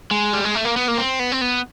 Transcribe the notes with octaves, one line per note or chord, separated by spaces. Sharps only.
G#3
G3
G#3
A3
A#3
B3
A#3
C4
B3
C4
B3